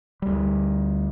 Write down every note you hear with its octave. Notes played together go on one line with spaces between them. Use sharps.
D2 G3